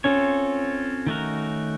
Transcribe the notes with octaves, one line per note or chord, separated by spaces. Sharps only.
C4 C#4 F4 A4 C#5
D#3 A3 D#4 F#4 A#4